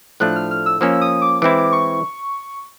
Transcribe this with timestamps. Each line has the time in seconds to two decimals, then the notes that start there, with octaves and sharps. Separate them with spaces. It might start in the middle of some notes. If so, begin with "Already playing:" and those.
0.20 A2 F3 A3 D4 F#6
0.36 F6
0.51 F6
0.66 E6
0.81 F3 A#3 C#4 E6
1.01 D#6
1.22 D6
1.42 E3 G#3 C4 E4 D6
1.72 C#6